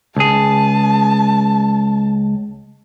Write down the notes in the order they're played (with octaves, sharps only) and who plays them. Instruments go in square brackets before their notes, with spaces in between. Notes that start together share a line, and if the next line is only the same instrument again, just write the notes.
[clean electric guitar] C#2 G#4 [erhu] A5